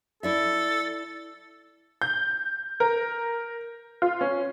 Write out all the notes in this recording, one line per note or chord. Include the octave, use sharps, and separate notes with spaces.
E4 A4 D5 E5
G6
A#4
F4
C#4